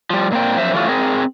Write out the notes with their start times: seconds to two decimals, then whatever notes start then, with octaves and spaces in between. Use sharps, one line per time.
0.10 F3 G3
0.32 A#2 A#3 C4 G5
0.58 F#2 F3 C5 E5
0.74 E3 F#3 A3 F4
0.89 C4 G#4 A#4